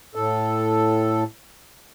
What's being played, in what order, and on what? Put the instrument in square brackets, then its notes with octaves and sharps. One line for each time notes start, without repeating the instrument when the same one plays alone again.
[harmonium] A2 A4